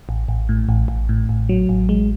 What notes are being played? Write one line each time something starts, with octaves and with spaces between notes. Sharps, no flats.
A1
A1
A2
A1
A1
A2
A1
F#3
A1
G#3